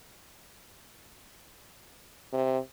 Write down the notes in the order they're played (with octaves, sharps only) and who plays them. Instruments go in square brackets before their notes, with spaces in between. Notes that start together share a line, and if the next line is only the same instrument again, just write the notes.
[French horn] C3